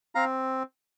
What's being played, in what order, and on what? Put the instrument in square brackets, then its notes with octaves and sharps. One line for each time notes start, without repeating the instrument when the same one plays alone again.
[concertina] C4 F5 A#5